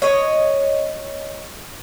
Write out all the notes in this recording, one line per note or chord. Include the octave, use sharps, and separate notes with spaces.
C#5 D#5